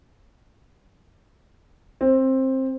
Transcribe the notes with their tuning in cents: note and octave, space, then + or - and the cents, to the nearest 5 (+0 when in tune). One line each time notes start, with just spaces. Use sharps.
C4 +15